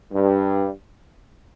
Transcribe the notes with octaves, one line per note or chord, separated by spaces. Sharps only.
G2